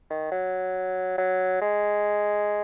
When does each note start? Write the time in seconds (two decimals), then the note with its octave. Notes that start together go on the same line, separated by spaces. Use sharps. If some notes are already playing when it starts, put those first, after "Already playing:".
0.10 D#3
0.32 F#3
1.18 F#3
1.61 G#3